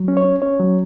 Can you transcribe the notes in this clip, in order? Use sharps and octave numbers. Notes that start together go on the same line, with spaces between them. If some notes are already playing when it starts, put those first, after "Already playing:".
Already playing: F#3
C#4
C#5
C#4
C#4 C#5
F#3